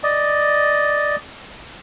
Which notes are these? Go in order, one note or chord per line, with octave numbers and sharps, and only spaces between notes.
D5 D#5